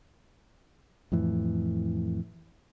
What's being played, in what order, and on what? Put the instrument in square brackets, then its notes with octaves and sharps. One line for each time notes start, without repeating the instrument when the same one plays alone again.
[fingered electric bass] F2 A2 E3